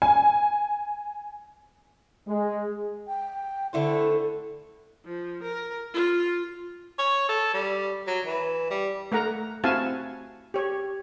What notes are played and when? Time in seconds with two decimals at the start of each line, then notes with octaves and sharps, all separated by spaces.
0.02 G#5
2.28 G#3
3.07 G5
3.73 D3 A3 E4 C5
5.05 F3
5.43 A#4
5.94 F4
6.99 C#5
7.29 A4
7.54 G3
8.07 F#3
8.25 E3
8.70 G3
9.12 A3 A#4 F#5 A#5
9.64 C4 E4 F#4 F5 G#5 A5
10.54 G4 C#5